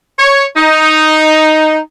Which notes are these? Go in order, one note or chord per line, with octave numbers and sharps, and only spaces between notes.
C#5
D#4